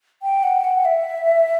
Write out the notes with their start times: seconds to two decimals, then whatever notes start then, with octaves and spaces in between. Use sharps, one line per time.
0.23 G5
0.43 F#5
0.60 G5
0.64 F#5
0.85 E5